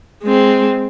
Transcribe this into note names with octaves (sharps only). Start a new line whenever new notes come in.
G#3 C4